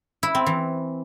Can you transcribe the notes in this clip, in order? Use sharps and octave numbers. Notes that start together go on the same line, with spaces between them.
E4
C4
E3